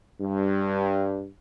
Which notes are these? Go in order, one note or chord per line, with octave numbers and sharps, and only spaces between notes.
G2